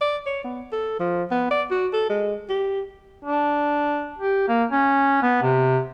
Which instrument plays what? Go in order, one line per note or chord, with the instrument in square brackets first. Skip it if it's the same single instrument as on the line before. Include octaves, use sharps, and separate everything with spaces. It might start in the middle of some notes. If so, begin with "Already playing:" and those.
[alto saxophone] D5
C#5
B3
A4
F3
B3
D5
F#4
A4
G#3
G4
[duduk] D4
G4
A#3
C#4
B3
C3